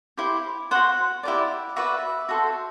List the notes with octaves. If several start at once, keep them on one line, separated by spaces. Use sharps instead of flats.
E4 G4 C5
F#4 C5 F#5
E4 G4 B4 D5
F#4 B4 D5 E5
F#4 A4 C5